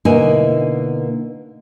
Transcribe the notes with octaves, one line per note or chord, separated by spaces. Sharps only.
B2 D3 A#3 D#4 E4 G#5